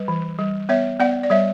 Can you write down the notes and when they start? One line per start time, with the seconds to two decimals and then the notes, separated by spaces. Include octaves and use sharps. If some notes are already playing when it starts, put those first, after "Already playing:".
Already playing: G3 B4
0.08 E3
0.39 G3
0.69 B3 C#5 E5
1.00 B3 D5 F#5
1.23 D5
1.30 G3 C#5 E5